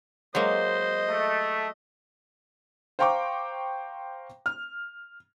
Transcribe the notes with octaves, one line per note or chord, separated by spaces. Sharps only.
F#3 G#3 A#3 C5 D#5
A3
C5 F5 G5 A#5 C#6 D6
F6